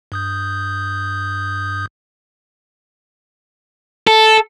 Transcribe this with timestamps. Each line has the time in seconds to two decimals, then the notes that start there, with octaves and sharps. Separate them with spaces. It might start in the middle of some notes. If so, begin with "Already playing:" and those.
0.12 G2 D#6 G6
4.07 A4